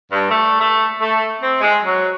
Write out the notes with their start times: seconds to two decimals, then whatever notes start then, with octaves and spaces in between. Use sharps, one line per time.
0.12 G2
0.29 A3
0.60 A3
0.98 A3
1.41 C4
1.61 G#3
1.84 F#3